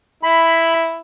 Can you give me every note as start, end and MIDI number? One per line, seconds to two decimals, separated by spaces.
0.23 0.99 64
0.23 0.74 83